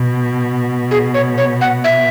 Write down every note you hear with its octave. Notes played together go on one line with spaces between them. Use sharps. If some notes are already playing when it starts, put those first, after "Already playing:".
Already playing: B2
G#4
C#5
C#5
F#5
E5